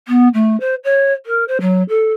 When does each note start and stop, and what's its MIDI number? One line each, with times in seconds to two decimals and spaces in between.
0.08 0.28 59
0.33 0.58 57
0.60 0.74 72
0.84 1.12 73
1.26 1.44 70
1.48 1.57 72
1.60 1.83 54
1.88 2.13 69